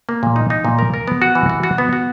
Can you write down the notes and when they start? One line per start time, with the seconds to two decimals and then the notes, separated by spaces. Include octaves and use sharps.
0.09 A#3
0.23 A#2
0.36 D#4
0.50 D#4
0.65 A#2
0.79 A#4
0.94 A#4
1.08 B3
1.22 F#4
1.35 E3
1.50 F#4
1.63 F#4
1.78 B3
1.93 F#4